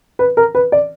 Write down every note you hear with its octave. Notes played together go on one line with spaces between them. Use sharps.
B4
A#4
B4
D5